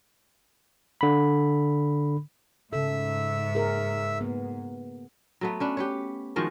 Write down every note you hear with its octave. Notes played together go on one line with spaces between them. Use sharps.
D3 B5
G#2 C#3 A4 E5 E6
G#4 A#4
A#3 B3
F#3 A3 B3
C#4 D4 B4
G4 B4 C#5
D#3 F3 G#3 F#4